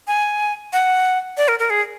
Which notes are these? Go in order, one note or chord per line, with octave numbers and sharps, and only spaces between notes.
G#5
F#5
D5
A#4
A#4
G#4